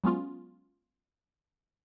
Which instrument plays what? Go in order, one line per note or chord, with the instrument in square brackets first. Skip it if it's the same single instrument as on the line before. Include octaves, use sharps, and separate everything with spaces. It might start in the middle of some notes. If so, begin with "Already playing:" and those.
[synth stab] F#3 G#3 B3 C#4 F4